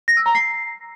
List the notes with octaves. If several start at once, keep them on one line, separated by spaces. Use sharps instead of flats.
A#6
E6
A#5
C7